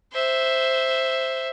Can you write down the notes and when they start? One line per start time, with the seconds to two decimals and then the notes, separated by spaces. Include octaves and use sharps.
0.12 C5 E5